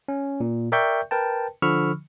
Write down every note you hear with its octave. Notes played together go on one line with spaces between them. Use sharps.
C#4
A#2
A#4 D5 E5 G5 C#6 G6
A#4 B4 G5 A5
D3 F3 B5 C#6 E6 F6